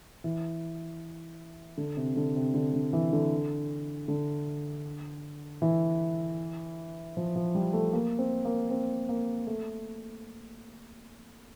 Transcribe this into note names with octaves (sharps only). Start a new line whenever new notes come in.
E3
D3
C3
D3
C3
D3
D3
E3
D3
D3
E3
F3
F3
G3
A3
A#3
C4
A#3
C4
A#3
A3